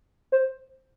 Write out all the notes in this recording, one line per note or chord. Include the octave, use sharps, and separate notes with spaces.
C5